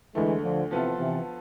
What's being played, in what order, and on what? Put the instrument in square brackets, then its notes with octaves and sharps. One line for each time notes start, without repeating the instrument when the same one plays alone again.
[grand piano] D2 D3 A3 [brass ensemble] E3 G#3
[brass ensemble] D3 F3
[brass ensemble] C3 E3 [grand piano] F3 B3 F4 A4
[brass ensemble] C3 E3